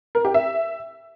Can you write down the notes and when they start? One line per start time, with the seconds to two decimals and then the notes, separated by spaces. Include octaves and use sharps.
0.15 A#4
0.25 G4
0.34 E5